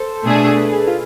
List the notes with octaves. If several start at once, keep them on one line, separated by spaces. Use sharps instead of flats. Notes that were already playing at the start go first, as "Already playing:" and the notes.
Already playing: A4 C5
B2 A3 D4 G#4
B4
G#4
F4